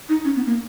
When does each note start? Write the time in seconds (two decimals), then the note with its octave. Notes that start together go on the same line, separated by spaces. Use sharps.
0.09 D#4
0.25 C#4
0.36 B3
0.47 A#3